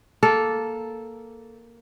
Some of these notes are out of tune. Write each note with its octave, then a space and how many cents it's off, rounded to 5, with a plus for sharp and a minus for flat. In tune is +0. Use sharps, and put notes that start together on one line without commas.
A#3 +0 A4 -5